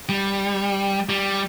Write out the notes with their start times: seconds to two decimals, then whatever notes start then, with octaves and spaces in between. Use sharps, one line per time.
0.09 G3
1.09 G3